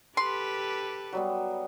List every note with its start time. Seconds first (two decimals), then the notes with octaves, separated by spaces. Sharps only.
0.17 G4 A4 B4 C6
1.13 F#3 G3 B3